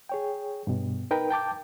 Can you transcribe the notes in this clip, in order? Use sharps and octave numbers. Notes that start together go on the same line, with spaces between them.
G#4 C#5 G5
G2 B2
D#4 A#4 B4 G5
G5 A5 D6 G6